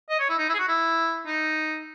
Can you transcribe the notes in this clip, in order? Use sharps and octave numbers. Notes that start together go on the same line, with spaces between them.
D#5
C#5
E4
D#4
E4
G#4
F#4
E4
D#4